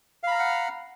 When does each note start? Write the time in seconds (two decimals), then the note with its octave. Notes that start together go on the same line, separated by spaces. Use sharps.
0.23 F5
0.27 B5
0.31 A#5
0.35 F6
0.39 F#5